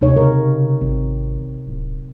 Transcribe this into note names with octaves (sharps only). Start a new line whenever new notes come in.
D#2 C3 D#4 C#5
C#3 A#4
G#1 C4
D1